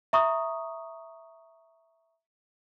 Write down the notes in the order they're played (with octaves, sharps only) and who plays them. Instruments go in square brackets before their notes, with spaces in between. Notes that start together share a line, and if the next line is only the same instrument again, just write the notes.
[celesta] E5 A#5 C#6 D#6